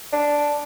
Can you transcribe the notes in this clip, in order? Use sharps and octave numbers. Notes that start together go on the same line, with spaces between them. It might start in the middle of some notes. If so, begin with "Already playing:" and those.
D4